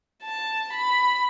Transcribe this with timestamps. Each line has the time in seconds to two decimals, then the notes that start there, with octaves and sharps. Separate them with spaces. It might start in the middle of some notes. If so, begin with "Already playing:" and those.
0.24 A5
0.72 B5